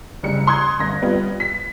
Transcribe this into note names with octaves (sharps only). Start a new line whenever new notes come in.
F#1 G3 C#7
A#5 C6 D#6 F#6 G#6
G1 A#6
G3 B3 F4
B6